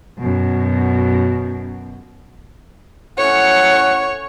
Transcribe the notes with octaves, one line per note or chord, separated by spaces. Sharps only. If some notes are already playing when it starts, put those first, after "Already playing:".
F#2 B2
A2 C#4 C#5 F#5